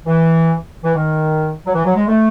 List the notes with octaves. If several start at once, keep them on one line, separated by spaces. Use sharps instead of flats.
E3
E3
D#3
F#3
E3
F#3
G#3
A3